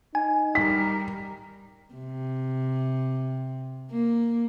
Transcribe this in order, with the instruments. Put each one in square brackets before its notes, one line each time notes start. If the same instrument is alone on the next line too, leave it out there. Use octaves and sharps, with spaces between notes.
[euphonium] D#4 [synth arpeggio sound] G#5
[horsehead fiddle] G3 A#4 [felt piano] B6
[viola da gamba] C3
A#3